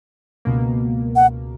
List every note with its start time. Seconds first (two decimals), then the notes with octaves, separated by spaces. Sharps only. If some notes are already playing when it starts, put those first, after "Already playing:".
0.45 C#2 B2 A#3
1.16 F#5